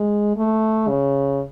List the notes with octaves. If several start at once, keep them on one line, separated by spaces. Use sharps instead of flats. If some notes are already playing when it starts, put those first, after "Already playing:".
Already playing: G#3
A3
C#3